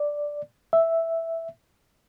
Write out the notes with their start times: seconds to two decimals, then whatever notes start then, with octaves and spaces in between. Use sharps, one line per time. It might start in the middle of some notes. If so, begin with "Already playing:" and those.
Already playing: D5
0.73 E5